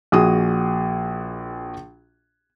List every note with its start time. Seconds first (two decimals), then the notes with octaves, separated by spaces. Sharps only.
0.12 A#1 F#4 G#4 D#6